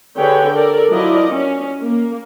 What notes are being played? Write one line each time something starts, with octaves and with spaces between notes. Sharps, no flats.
D3 G4 G#4 B4 C#5 G5
A4 A#4 D5
F3 F#3 E4 A#4 D5 D#5
C#4
A#3